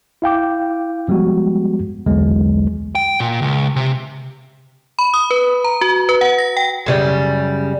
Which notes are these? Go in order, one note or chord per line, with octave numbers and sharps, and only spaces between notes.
E4 F5 G5 D6
F3 G3 G#3 B3 F#4 G4
B1 E2 D3 F#3 G#3
G5
A#2
C#2
C3
B5
D#6
B4
A#5
F#4
B4
F#5
A#6
G5
F#2 C#3 G3